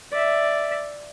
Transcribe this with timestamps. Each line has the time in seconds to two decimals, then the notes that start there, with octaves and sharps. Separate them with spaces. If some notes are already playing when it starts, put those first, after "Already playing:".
0.12 D5 E5